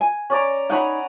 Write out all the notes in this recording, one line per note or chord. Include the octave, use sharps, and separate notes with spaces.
G#5
C#4 D5 A#5
D#4 C#5 F#5 G#5 A#5 B5